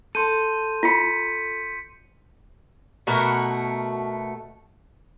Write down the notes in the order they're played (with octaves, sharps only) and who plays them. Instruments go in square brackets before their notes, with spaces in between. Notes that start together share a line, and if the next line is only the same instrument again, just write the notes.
[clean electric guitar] A4 [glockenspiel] C6 G6 D#7
[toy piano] F4 B5 [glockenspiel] B6 C#7
[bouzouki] B2 A3 F#4 A#4